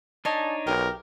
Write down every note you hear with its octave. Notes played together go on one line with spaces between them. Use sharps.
D4 D#4 C#5 D#5 G#5 A5
B1 G4 A#4